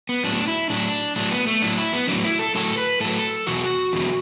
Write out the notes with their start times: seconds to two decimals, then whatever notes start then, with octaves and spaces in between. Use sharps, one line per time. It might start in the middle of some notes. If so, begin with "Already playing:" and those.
0.09 B3
0.24 A2 F#3 D4
0.47 E4
0.70 A2 F#3 D4
1.16 A2 F#3 D4
1.31 B3
1.47 A3
1.62 A2 F#3 D4
1.78 E4
1.93 B3
2.08 A2 F#3 D4
2.24 E4
2.39 A4
2.55 A2 F#3 A4
2.77 B4
3.00 A2 F#3 A4
3.47 E2 B2 F#3 F#4
3.93 E2 B2 F#3